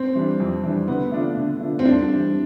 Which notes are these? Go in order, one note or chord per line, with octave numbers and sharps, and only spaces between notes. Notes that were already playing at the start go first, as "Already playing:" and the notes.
Already playing: C4
E3 G3 D4
F2
E3 G3 D4
D3 B3
A3 D4 F4
D3
A3 D4 F4
C4
G2 D4
E3 G3